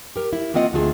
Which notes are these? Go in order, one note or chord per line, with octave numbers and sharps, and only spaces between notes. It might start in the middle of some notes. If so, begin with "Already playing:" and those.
G4 A#4
E4
A#3 C4 F4 D#5 F5 F#5
D2 D3 A3 F4 G#4